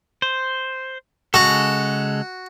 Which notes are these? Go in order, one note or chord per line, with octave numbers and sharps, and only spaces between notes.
C5
C#3 G#3 F#4 A4